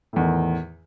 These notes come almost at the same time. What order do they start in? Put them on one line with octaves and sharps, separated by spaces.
A2 E2 D#3